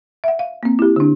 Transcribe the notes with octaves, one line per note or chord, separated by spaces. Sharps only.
E5 F#5
F5
A#3 C4
E4 G4
D3 D4